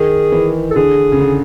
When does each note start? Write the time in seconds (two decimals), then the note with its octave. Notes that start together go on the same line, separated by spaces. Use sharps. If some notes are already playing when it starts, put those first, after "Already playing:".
Already playing: D#3 G#4
0.32 E3
0.71 A4
0.76 D3 G#4
1.12 C#3
1.19 D3